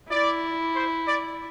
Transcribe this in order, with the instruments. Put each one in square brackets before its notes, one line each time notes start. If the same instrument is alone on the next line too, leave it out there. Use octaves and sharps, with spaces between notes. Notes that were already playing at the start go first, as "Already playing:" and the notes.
[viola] E4 [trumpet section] D5
[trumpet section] C5
D5